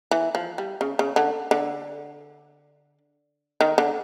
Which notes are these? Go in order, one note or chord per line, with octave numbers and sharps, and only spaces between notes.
E3
F3
G3
C#3
C#3
D3
D3
D#3
D3